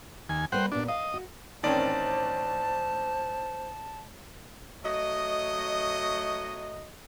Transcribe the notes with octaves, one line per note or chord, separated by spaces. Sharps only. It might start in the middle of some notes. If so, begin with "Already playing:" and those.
D#2 G#5
G3 A#3 B4 C5 F#5 G5
A#2 B3 D4 G4
D#5 F5
F#4
A1 D#3 C4 C#4 C5 D5 A5
F#3 A3 D#5